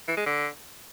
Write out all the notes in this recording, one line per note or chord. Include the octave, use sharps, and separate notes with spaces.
E3
G#3
D3